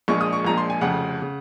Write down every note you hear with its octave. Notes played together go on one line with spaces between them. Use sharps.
A#1 A#2 F3 G#3 C#6
D#6
C#6
A#1 A#2 F3 G#3 A#5
C6
G#5
F1 F2 C#3 F#5
C#3